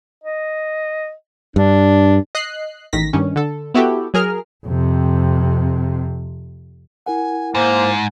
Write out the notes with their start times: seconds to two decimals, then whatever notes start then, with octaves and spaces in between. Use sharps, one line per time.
0.24 D#5
1.56 G2 D4
2.35 D#5 F#6 C7
2.93 A1 D#3 A#6 B6
3.13 G2 D#3 C#4
3.36 D3 A4
3.74 B3 E4 F#4 G4 A4
4.14 F#3 G#4 A#4 F6
4.66 F2 C3
7.06 E4 A#4 F#5 G#5
7.55 G#2 A#3 C5